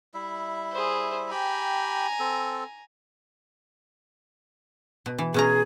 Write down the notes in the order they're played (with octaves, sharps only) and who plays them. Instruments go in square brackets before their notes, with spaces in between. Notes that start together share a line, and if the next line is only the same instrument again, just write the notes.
[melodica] G3 E4 E5
[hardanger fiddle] G#4 C5
[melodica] G4 G5 B5 [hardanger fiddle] G#5 A#5
[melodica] C4 A4
[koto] B2
E3
[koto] B2 C#4 A#5 [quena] G#4